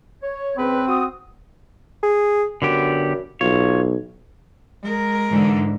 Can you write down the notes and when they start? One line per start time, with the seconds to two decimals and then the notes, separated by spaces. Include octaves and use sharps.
0.23 C#5
0.57 C#2 C4 B4
0.87 F#4 D#6
2.03 G#4
2.62 F#2 D3 B3 G4
3.41 B1 F4 C#5
4.83 G#3 A#4
5.30 G#2 D3 E3